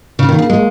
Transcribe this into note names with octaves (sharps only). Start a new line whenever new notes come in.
C#3
D#3 A#3
C#3
G#3